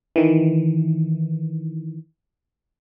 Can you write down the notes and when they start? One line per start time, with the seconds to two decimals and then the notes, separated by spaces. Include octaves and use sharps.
0.16 D#3 E3